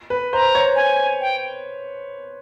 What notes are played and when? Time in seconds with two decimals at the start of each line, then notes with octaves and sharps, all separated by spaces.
0.10 B4
0.33 C5 A#5
0.55 C#5
0.76 G#5
1.21 G5